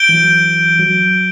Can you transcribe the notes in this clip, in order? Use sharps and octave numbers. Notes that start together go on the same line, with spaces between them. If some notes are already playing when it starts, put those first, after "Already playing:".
Already playing: G6 D7 G7
E3
F#3
F#3